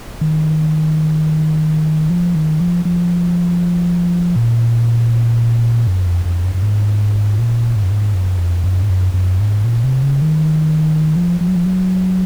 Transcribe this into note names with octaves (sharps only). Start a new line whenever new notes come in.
D#3
F3
D#3
F3
F3
A#2
F#2
F2
F2
F#2
F#2
G#2
A#2
G#2
F#2
G#2
F#2
F2
F#2
G#2
F#2
F#2
G#2
A#2
C3
C#3
D#3
F3
F3
F#3
F3
F#3